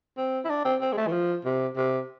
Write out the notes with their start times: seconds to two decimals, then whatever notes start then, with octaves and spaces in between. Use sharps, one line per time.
0.18 C4
0.45 E4
0.50 D4
0.65 C4
0.81 C4
0.93 G#3
0.97 A3
1.07 E3
1.13 F3
1.45 C3
1.77 C3